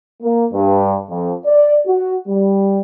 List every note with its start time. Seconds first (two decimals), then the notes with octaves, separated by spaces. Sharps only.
0.23 A#3
0.53 G2
1.10 F2
1.45 D5
1.86 F#4
2.28 G3